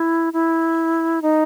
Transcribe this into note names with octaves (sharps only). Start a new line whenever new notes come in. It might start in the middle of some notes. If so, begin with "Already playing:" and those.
Already playing: E4
E4
D#4